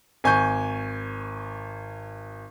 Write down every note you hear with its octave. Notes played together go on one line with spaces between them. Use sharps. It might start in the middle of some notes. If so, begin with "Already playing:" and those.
G#1 G#5 C#6 G6